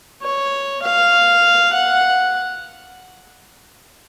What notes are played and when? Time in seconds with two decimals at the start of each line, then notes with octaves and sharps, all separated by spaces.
0.22 C#5
0.82 F5
1.73 F#5